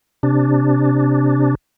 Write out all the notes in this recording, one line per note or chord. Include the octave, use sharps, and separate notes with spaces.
C3 D4